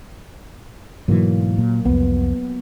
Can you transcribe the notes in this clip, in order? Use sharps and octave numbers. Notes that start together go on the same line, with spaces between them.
G#2 B2 E3 F#3 A#3
A#2
C2 F2 B3